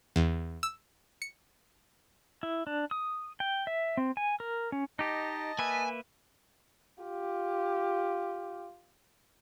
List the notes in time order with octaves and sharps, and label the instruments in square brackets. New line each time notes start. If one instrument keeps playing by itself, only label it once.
[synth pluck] E2
E6
C#7
[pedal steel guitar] E4
D4
D#6
G5
E5
C4
G#5
A#4
C#4
[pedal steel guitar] D#4 G4 [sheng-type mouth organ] D#5 A5
[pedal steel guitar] A#3 B4 E5 [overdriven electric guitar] G#5
[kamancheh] F4 G4